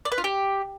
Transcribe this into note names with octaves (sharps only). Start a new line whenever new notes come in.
D5
B4
F4
G4